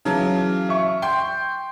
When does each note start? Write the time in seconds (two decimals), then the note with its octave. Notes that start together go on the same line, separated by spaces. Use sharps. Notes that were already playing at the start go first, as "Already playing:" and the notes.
0.05 C#3 E3 F#3 A5
0.69 E5 C#6
1.02 G5 C6 G6